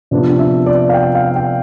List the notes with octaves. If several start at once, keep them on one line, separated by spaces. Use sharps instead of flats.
C3 F3 B3 D4
E5
D5
F5
G5
F5
G5